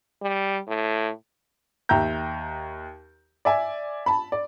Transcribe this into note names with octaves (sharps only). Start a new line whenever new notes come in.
G3
A2
D#2 E5 G5 A#5 G6
D5 E5 G#5
A5 B5
D5